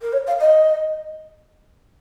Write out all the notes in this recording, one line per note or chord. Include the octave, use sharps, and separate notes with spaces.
A#4
C#5
F5
D#5